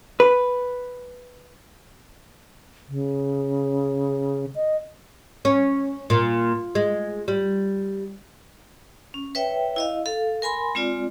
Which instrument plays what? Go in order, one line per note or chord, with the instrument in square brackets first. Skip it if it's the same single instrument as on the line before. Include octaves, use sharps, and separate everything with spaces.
[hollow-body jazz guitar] B4
[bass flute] C#3
D#5
[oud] C#4
A#2
G#3
G3
[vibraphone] C#4
B4 C#5 E5 G5
E4 D#5 F5
A4 F5
A#4 G#5 B5 C6
G#3 C4 F4 D5